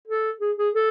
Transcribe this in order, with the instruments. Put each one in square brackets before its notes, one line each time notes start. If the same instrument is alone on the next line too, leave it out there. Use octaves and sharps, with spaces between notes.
[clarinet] A4
G#4
G#4
A4